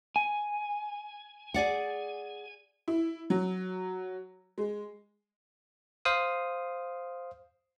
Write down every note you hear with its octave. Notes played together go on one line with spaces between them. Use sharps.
G#5
G#4 D5 F#5
E4
F#3
G#3
C5 F5 D#6